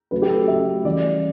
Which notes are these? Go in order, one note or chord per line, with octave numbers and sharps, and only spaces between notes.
C#3 F#3 A3 B4
G4
A4
C#3 F#3 A3 E5
C#3 E3 G3 D5